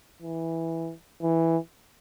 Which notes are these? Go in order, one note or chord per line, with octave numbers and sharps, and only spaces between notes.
E3
E3